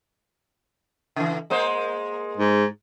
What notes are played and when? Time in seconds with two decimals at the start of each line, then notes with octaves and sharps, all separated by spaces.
1.16 C#3 E3
1.50 G#3 A#3 C5
2.37 G#2